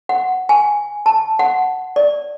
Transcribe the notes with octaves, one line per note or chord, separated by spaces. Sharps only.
F#5
G#5
A5
F#5
D5